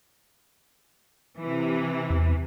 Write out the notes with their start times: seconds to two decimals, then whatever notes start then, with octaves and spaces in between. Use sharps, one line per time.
1.39 C3 E3
2.10 E2